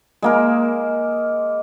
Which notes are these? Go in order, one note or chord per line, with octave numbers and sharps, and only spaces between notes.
G#3 A#3 A#4